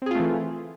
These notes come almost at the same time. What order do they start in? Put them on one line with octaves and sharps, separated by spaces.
C4 G#4 F4 A3 E3